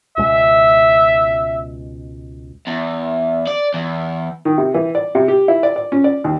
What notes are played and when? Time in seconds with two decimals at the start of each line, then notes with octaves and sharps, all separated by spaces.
0.17 C#2 B2 G#3 E5
2.67 E2
3.47 D5
3.74 E2
4.45 D#3
4.58 C3
4.74 E3
4.95 D5
5.15 C3
5.28 G4
5.48 E4
5.63 D5
5.76 D5
5.92 C#4
6.04 D5
6.24 D#2